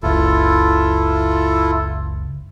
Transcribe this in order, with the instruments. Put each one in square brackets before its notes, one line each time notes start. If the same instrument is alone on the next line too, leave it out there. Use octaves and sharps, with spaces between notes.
[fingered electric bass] F#1 C#2 [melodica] E4 F4 A4